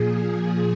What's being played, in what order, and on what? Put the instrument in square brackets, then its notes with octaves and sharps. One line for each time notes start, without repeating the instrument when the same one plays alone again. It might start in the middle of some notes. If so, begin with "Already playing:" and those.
Already playing: [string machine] A#2 F3 G#4